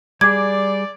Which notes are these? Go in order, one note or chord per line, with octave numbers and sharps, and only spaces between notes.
G3 G#4 D5 D6 G#6